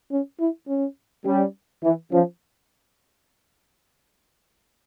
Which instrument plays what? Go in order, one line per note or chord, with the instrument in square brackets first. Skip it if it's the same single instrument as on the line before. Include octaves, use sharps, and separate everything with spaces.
[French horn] C#4
E4
C#4
[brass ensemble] G3 [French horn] C#4
[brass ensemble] E3 [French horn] E4
[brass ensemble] F3 [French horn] C#4